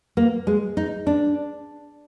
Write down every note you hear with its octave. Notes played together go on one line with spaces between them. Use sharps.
A#3
G#3
D#4
D4